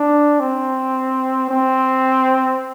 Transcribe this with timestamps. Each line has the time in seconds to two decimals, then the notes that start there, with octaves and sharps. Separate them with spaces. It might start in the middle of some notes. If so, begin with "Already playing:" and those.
Already playing: D4
0.40 C4
1.50 C4